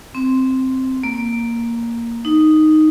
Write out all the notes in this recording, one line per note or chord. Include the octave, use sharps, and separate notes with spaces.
C4
A#3
D#4